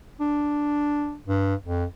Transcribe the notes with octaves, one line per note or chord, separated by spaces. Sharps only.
D4
G2
F2